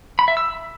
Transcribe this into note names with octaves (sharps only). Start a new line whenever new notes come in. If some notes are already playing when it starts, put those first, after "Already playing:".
B5
E5
E6